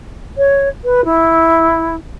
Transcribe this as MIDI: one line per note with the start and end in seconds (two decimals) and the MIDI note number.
0.38 0.69 73
0.84 1.04 71
1.05 1.96 64